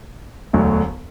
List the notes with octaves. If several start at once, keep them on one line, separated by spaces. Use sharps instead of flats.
E1 D2 D3 F#3 A3